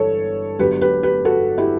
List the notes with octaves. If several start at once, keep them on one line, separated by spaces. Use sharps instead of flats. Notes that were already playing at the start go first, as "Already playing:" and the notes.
Already playing: G1 G2 E3 G3 A4 C#5
G1 G2 F#3 G4 B4
G4 B4
G4 B4
F#4 A4
E4 G4